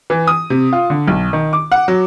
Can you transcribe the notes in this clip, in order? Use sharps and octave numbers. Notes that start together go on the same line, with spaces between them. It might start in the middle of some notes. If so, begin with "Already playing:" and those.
E3
D#6
C3
F4
D3
B1
D#3
D6
F#5
F#3